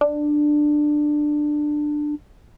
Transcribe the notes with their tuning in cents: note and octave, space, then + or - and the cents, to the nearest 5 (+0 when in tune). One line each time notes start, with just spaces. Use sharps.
D4 +15